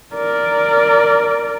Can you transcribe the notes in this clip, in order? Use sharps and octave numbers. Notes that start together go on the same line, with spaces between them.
A#4 D5